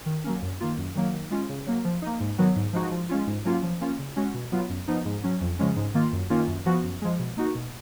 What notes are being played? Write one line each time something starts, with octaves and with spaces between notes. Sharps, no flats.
D#3
F#3 A#3 C#4
F#2
D#3 A#3 F4
F#2
D#3 F#3 A#3
D#3
G#3 C#4 F4
C#3
F#3 A#3
F3
A#3 D#4
G#2
D#3 F#3 B3
G#2
F3 G#3 D#4 F#4
F3
G#3 C#4 F4
G#2
F#3 A#3 C#4 F4
F3
A#3 C#4 F4
C#3
G#3 C#4 F#4
B2
F#3 B3 F4
F#2
F3 B3 D#4
G#2
F#3 C#4
F2
C#3 F3 G#3 C#4
G#2
D#3 A#3 F4
F#2
D#3 A#3 C#4 F4
F#2
F3 B3 F#4
F#2
F3 G#3
B2
A#3 D#4 F#4
B2